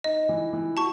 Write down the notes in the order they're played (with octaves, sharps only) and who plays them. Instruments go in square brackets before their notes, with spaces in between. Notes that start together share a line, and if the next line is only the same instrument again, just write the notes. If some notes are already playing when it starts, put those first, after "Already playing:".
[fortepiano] D#4 [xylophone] D#5
[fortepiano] E3
E3
[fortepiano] F#4 [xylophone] A5 C#6